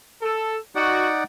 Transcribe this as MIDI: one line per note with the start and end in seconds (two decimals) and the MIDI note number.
0.22 0.56 69
0.75 1.24 63
0.75 1.06 66
0.75 1.24 74
0.75 1.24 78